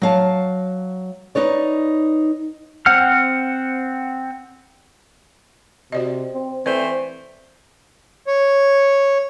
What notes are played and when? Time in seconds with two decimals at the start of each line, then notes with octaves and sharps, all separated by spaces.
0.02 F#3 F5 A5
1.35 D#4 B4 C#5 D5
2.86 C4 F#5 F6
5.92 C3 F#4 D5 D#5
6.34 C4
6.66 E3 A3 C4 B4 C5 D5
8.27 C#5